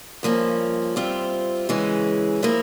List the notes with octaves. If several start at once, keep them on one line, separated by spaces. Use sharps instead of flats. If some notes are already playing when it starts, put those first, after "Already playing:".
G2 F3 A#3 C#4
G3 C4 F4 C5 E5
C#3 E3 G#3 C#4
A#2 F3 A#3 E4